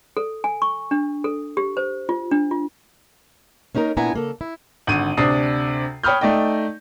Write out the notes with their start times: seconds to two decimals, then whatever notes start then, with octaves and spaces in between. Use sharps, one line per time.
0.17 A4
0.44 G#5
0.62 C#6
0.91 D4
1.24 A4
1.57 G4
1.77 C5
2.09 F4
2.31 D4
2.51 F4
3.75 A#3 C#4 D#4 A4 A#4
3.97 A#2 B3 D4 E4 G#5 A#5
4.13 C#3 A#3 A4
4.41 E4
4.87 G#1 D3 D#7
5.17 D2 C3 D4 D#6 C7
6.03 C#5 G5 B5 D#6 F6 G6
6.21 A3 D#4 D5 D#5 G5